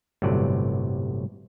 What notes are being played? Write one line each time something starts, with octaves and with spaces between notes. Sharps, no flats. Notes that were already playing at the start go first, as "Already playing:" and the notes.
G1 A2 C3 F#3 D5